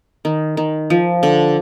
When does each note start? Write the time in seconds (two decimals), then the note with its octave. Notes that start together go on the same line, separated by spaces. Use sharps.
0.25 D#3
0.57 D#3
0.90 F3
1.23 D3